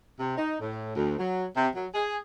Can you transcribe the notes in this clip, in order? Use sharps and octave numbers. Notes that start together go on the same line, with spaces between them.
C3
D#4
A2
D2
F#3
C3
F#3
G#4